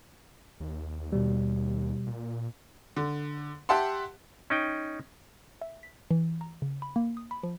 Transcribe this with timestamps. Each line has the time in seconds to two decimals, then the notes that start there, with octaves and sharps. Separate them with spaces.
0.60 D#2
1.12 D#2 B2 G3
2.07 A#2
2.97 D3
3.69 G4 E5 F#5 A5 C6
4.50 C#4 D#4 G5
5.62 E5
5.83 B6
6.11 E3
6.41 A#5
6.62 C#3
6.82 B5
6.96 A#3
7.17 D#6
7.31 B5
7.43 F3